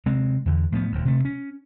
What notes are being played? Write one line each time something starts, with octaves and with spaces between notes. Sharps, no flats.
C3 G#3 C4
E2 D3
A2 F3 B3
D#1 D2
C3 A3
C#4